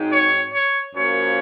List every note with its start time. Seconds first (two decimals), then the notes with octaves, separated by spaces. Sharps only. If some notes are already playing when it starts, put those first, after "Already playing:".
Already playing: G#2 F#3 C4 D#4
0.09 C#5
0.52 C#5
0.95 F#2 F3 A#3 C#5